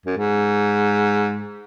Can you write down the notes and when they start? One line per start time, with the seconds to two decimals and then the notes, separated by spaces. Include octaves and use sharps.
0.06 F#2
0.17 G#2